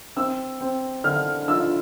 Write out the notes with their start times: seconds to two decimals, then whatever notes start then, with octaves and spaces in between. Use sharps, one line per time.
0.16 C4 E6
0.61 C4
1.04 D3 F6
1.48 F4 E6